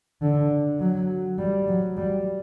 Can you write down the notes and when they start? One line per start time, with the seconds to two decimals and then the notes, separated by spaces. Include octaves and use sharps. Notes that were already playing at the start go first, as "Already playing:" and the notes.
0.22 D3
0.80 F#3
1.38 G3
1.68 F#3
1.97 G3